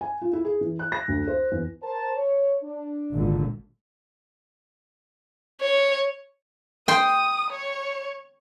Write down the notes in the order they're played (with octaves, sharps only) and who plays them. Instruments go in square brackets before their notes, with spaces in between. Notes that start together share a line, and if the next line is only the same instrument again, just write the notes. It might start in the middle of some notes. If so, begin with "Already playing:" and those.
[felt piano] G#5
F4
E4
G#4
E3
F#6
A#6
D2
C5
E2
[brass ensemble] A#4 C5 A5
C#5
D4
[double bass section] G#1 A#2 D3
[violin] C#5
[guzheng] G5 C6 [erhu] D#6
[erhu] C#5